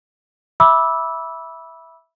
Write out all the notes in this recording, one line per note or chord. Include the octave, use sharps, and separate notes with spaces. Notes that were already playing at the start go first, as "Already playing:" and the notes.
E5 B5 D6 E6